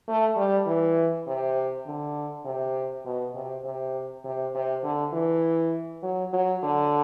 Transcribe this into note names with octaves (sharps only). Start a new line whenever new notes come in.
A3
G3
E3
C3
D3
C3
B2
C3
C3
C3
C3
D3
E3
F#3
F#3
D3